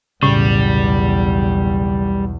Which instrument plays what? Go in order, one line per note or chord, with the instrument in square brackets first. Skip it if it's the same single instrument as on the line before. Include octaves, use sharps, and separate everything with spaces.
[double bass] B1 E2 [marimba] A2 [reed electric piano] C#3 [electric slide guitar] G3